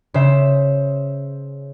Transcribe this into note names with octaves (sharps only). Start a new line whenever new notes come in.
C#3 C5 E5